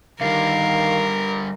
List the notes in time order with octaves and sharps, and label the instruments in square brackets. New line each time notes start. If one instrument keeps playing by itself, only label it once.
[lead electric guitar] D3 G3 [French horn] D#3 [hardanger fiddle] A#4 [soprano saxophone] F5